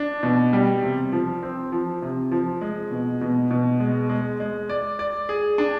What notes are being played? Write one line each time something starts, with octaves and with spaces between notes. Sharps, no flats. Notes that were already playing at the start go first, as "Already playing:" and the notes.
Already playing: D4
B2
G3
C3
F3
C4
F3
C3
F3
G#3
B2
B2
B2
G#3
G#3
G#3
D5
D5
G#4
D4